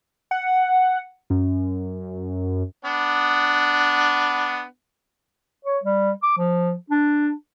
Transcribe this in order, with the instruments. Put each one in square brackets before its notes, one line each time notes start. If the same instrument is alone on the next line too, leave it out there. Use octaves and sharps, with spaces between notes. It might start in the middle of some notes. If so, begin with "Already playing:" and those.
[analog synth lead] F#5
F#2
[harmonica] B3 D4
[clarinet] C#5
G3
D6
F3
D4